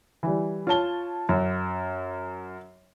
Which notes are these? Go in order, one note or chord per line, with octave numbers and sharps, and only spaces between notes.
E3 G3
F4 C#5 A5 G7
F#2